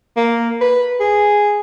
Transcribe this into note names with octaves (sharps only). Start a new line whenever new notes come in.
A#3
B4
G#4